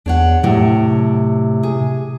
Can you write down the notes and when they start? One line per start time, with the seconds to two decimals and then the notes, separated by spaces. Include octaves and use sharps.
0.06 E2 D4 C#5 F#5
0.43 A2 C3 F#3
1.63 G#4